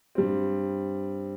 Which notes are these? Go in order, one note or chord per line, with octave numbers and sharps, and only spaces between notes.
G2 G3 C4